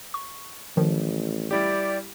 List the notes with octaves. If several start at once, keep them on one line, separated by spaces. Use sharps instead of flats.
C#6
A1 D#3 F3
G3 E4 G4 D5